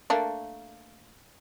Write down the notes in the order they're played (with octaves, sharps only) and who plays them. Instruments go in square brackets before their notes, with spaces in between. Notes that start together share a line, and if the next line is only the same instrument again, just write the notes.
[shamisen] A3 A#3 D4